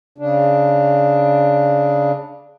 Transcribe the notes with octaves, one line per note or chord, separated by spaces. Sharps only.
C#3 D4